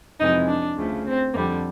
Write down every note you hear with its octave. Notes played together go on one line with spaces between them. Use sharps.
F2 C3 E3 G#3 D#4
D4
D2 C#3 F3 A3
C4
F2 D3 G3 A#3